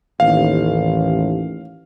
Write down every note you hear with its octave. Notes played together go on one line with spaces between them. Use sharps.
A1 D#2 F5